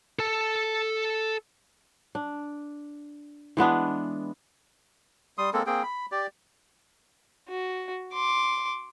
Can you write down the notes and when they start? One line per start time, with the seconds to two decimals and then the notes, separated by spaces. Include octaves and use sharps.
0.19 A4 A5
2.15 D4
3.57 E3 G#3 B3 D4
5.38 G3 C6 D#6
5.53 G#3 A#3 C4 A4
5.66 A#3 C4 G#4 G5
5.83 B5
6.12 G4 D5
7.48 F#4
8.13 C6 D6